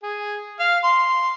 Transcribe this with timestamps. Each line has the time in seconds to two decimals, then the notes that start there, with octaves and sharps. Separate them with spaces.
0.03 G#4
0.59 F5
0.84 C6